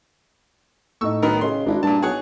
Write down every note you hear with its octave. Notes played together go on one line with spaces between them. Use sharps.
A2 D#4 C#6 E6
B1 D#3 B3 A#4
C#3 G#4 D#5 C6
G#1 D4 E4 F#4
G2 A#2 A5
B1 G#4 C#5 F#5